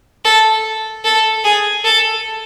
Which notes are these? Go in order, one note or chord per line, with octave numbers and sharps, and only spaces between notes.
A4
A4
G#4
A4